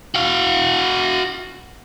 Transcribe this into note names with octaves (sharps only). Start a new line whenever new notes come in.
F#4 F5